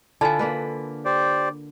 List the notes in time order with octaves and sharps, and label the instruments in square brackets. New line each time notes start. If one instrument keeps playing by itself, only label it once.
[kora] D3 E4 F4 [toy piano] G#5 A5
[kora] D3 A#3 B4
[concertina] G4 C5 D5